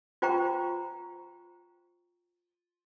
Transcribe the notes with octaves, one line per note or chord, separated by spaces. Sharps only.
F4 C5 G5 A#5 C#6